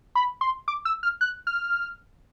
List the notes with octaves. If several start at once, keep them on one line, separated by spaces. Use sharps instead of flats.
B5
C6
D6
E6
F6
F#6
F6